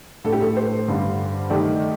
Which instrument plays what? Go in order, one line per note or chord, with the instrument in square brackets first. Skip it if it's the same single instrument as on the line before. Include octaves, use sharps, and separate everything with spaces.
[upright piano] A2 A3 D4 [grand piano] A4
[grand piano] G4
A4
C5
[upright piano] G2 D3 G3 D4
[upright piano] D#3 A3 D#4 G4 [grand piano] D5